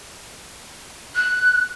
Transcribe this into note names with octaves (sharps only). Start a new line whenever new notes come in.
F#6